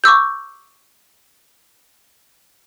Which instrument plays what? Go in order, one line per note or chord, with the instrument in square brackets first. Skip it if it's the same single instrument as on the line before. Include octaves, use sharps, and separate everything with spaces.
[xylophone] C#6 D6 E6 G6